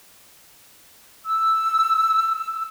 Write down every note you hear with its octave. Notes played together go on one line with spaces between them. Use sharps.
E6